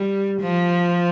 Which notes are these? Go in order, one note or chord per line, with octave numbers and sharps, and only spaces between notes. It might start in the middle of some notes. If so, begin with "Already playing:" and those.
Already playing: G3
F3